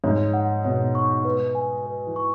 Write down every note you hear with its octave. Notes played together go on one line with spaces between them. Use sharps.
G#2 C#5
F#5
B2 C#5
C#6
B4
G#5
B4
E3
C#6